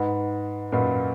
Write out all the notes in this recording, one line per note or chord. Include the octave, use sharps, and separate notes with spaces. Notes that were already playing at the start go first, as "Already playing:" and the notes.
Already playing: G#2 B4 D#5 F#5 B5
F#2 A#2 B4 D#5 F#5 B5